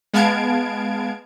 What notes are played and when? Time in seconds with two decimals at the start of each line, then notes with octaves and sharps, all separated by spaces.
0.14 G#3 B3 F5 A5 G#6 D7